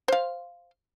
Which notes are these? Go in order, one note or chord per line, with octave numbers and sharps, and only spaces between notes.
C5 F5